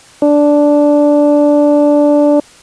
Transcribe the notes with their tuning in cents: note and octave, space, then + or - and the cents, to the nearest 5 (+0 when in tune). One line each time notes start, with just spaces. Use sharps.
D4 -5